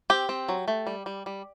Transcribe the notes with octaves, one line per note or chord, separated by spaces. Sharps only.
C4 G4 G5
C4
F#3
A3
G3
G3
G3